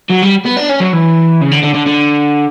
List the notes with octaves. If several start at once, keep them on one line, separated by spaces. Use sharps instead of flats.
F#3
G3
B3
D4
C#4
F#3
E3
C#3
D3
D3
D3
D3